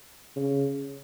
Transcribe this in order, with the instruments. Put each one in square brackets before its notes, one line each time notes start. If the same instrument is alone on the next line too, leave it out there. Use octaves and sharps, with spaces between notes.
[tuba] C#3